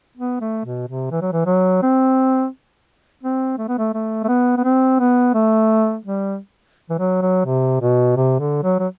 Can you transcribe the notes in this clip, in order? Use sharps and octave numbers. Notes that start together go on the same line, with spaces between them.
B3
A3
B2
C3
E3
F#3
E3
F#3
C4
C4
A3
B3
A3
A3
A3
B3
B3
C4
B3
A3
G3
E3
F#3
F#3
C3
B2
C3
D3
F#3
F#3